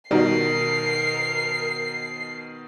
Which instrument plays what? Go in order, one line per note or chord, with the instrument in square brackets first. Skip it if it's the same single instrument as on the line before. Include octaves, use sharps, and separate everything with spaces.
[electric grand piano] B2 D#3 [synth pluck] G3 D#4 F#4 [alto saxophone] A#4 [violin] C7